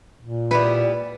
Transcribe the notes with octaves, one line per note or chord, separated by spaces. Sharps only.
A#2
G3 B3 E4 B4